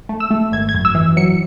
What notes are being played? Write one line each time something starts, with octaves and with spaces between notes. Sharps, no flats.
A3
E6
A3
G#1 G#6
G#6
F#2
E6
E3
F#3 C#7